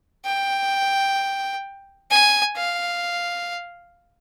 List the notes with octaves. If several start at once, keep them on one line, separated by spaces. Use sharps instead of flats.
G5
G#5
F5